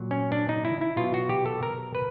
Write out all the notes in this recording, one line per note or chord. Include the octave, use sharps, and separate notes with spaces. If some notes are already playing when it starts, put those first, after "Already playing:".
Already playing: A#2 F#3
C#4
D4
D#4
E4
E4
B2 F#3 F4
F#4
G4
A4
A#4
B4